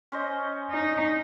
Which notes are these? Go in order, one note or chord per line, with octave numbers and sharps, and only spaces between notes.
C#4 C5 D#5
D#4